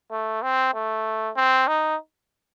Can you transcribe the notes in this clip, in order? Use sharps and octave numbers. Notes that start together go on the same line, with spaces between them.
A3
C4
A3
C4
D#4